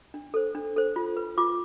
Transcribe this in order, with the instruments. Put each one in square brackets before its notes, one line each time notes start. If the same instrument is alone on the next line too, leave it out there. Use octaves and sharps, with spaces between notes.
[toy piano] D4
A4 C5
D4
A4 C5
F4
B4
F4 D6